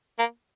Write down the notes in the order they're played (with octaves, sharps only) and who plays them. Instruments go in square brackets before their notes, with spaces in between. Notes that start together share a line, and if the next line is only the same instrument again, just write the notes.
[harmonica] A#3